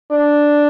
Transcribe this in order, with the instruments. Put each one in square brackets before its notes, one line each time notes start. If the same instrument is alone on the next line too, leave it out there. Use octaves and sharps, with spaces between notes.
[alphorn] D4